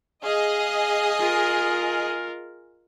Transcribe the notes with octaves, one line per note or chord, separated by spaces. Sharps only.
G#4 D#5 F5
F4 A#4